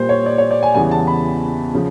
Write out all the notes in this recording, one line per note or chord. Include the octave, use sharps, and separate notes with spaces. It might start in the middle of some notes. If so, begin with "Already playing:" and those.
Already playing: A#2 G3 A#3 C5
C#5
D5
C#5
D5
G#5
E2 C#3 E3 G3 B3 G#5
A5
B5
C#3 F3